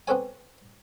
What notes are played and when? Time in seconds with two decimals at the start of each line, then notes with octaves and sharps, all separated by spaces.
0.08 B3 C4 D4 A4 C#5 G#5